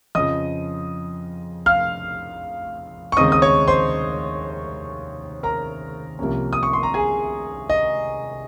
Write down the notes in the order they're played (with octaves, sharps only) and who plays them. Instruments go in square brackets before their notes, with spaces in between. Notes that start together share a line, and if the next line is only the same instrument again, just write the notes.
[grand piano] F2 C#3 F3 D#5 D#6
F5 F6
C#6
D#2 C#3 G#3 C4 D#4 D#5 D#6
D#6
C#5 C#6
C5 C6
A#4 A#5
C2 C3 F3 A#3 C#4
D#6
C#6
C6
A#5
G#4 G#5
D#5